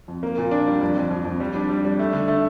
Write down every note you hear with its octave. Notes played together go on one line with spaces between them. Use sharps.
F2
A#3
A#2
D4
G3
F2
F2
F2
F2
G3
D4
G3
G3
A3
D3
A3